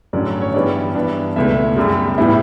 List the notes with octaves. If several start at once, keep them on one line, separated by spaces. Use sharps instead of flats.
A1 G2 D3 F#3 C#4 D5
C#5
G2 E3 G3 B3 D4 D5
G2 E3 B3 D4
C#2 B2 A3 E4 E5
F#2 C#3 G3
A2 G3 B3 E4